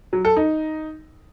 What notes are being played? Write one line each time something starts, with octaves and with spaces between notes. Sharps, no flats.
F#3
A4
D#4